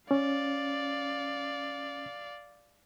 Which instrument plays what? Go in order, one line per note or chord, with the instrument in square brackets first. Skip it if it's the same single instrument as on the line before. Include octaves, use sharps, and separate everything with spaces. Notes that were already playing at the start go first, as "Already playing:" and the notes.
[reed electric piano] C#4 [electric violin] D5 F5